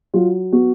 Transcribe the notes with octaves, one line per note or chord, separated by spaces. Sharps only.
F#3 F4
B3 F#4